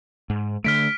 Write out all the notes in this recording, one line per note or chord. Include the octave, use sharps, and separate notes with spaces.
G#2
D3 A3 F6 B6 D7